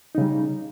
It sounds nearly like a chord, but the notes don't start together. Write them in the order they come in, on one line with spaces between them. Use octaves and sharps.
D#4 C#3 G3